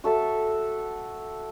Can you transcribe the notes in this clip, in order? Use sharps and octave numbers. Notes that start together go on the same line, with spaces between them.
F#4 A4 E5 A5